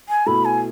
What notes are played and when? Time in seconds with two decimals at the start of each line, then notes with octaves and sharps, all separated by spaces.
0.09 G#5
0.26 B2 A3 E4 B5
0.45 G#5